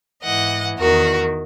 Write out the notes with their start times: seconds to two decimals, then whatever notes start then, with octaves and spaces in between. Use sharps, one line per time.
0.24 G#2 E3 D#5 F#5
0.78 E2 D#3 F#4 A#4